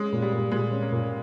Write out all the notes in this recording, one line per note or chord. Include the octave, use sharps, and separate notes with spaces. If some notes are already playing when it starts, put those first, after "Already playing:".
Already playing: G#3 C#4
A#2
G3
A#2
A#2 G#3
C#4
A#3
A#2